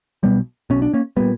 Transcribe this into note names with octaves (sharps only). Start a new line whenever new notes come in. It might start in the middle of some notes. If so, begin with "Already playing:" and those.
B1 B2 G3 B3
B1 B2 C#4
D4
A#3 C#4
A#2 G3 B3